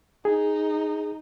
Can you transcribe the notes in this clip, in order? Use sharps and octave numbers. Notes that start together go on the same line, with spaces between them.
D#4 G#4